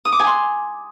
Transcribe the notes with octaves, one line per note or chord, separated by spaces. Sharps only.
D#6
D6
G#5
C6